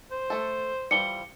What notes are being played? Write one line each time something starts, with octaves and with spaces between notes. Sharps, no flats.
C5
A3 A4
E3 F3 G3 C#7 G7